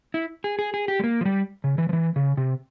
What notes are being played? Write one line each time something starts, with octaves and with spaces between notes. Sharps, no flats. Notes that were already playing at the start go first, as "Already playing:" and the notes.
E4
G#4
G#4
G#4
G4
G#3
A#3
F3
G3
C#3
E3
F3
E3
C#3
C3